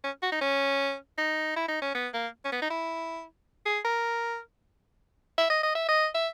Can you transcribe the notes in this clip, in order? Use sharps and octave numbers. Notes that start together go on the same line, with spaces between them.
C#4
F#4
D#4
C#4
D#4
E4
D#4
C#4
B3
A#3
C#4
B3
D#4
E4
G#4
A#4
E5
D#5
D#5
E5
D#5
E5